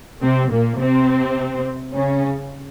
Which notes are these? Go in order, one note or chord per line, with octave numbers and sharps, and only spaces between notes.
C3 C4
A#2 A#3
C3 C4
C#3 C#4